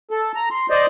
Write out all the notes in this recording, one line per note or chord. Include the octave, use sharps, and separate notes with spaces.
A4
A#5
C6
C5 D5 D#5